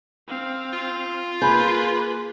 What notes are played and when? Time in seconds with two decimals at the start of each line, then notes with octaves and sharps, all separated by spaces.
0.28 C4 F5
0.73 F4
1.42 A#3 G#4 B4 B5 G6